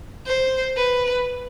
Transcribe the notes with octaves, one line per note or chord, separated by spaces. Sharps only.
C5
B4